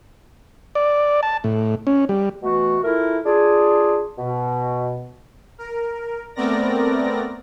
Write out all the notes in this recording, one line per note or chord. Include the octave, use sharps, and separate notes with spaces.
D5
A5
A2
C#4
G3
B2 E3 A3 F#4
A3 E4 F4 A#4
D4 F4 G#4
B2
A#4
A3 B3 C4 A#4 D5 A#6